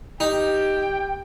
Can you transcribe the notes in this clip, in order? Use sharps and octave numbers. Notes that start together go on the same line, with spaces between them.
D#4 G4 G5